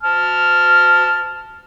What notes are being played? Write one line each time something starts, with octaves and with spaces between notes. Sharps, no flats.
A5 F6